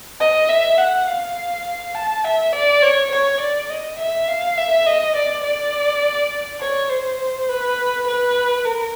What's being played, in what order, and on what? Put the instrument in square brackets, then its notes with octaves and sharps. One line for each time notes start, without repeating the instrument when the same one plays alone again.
[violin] D#5
E5
F#5
F5
A5
E5
D5
C#5
C#5
D5
D#5
E5
F5
E5
D#5
D5
D5
C#5
C5
B4
B4
A#4